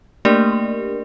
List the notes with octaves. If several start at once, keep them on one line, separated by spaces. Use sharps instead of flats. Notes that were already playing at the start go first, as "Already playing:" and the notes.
A3 A#3 D4 G4 A#4 D5